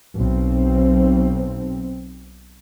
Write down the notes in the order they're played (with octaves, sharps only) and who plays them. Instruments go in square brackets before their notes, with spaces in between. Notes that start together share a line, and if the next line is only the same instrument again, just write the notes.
[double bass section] B1 C4